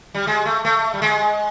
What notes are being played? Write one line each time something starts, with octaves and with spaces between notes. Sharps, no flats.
G3
G#3
A3
A3
G3
G#3